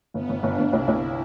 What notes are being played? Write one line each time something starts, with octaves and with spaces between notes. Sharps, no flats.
G1 B3
G1
G1 D4
G1
C2 E4
C2